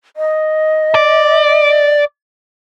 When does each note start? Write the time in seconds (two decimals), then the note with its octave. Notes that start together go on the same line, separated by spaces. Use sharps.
0.17 D#5
0.95 D5